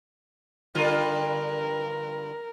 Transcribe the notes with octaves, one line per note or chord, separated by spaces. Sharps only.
G2 D3 F4 A#4